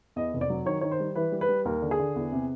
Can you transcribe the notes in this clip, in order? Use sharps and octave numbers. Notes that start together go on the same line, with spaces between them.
E2 D#5
F1
D5
F#3
D#3 C#5
D#3 C#5
C5
G3
E3 B4
G3
B4
G3
D#2 A#4
D3
G#4
D3
E2
C3